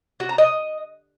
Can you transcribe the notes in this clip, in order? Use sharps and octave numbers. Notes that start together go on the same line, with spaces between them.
F#4
A#5
D#5